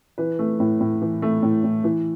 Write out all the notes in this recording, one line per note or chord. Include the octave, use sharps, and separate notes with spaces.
E3 B4
A3
A2
A2
E3
A3
A2
A2
E3